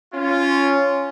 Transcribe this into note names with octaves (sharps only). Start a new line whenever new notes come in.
C#4 F4